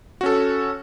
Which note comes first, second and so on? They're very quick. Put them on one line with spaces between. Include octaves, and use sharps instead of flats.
F#4 C#4 A4